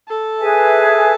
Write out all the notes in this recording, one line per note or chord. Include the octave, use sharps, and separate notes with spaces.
A4
G#4 B4 E5 G#5